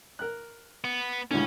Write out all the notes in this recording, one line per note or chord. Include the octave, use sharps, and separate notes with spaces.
A#4 F#6
B3
C#2 A2 D3 C#4